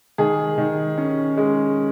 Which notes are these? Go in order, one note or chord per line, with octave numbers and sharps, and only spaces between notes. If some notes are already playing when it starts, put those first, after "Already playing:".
D#3 G#4
D#3
C#4
G#3